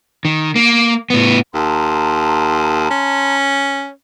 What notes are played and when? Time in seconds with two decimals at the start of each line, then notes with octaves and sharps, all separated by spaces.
0.25 D#3
0.56 A#3
1.10 A2 B3
1.55 D#2 A5 A#5 C6
2.91 C#4